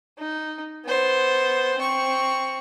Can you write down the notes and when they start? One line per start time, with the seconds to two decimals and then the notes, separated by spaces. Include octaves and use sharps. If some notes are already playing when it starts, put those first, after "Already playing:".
0.19 D#4
0.85 B3 C5
1.77 C4 C#6